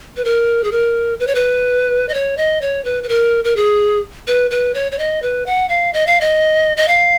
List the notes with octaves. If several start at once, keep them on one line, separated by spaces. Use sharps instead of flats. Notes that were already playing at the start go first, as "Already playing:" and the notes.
B4
A#4
G#4
A#4
B4
C#5
B4
D#5
C#5
D#5
C#5
B4
B4
A#4
A#4
G#4
B4
B4
C#5
C#5
D#5
B4
F#5
F5
D#5
F5
D#5
D#5
F5